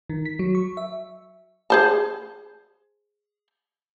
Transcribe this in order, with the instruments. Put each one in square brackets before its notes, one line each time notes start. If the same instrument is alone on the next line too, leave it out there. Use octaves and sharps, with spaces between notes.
[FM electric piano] D#3
B6
F#3
C#6
E5
[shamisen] G#4 C5 A5